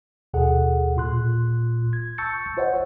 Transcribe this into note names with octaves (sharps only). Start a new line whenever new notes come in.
D#2 B2 G#4 A4 F#5
A#2 F4 C6 F#6
G#6
A5 C#6 E6 G6 A6 C#7
F4 C5 C#5 D#5 F#5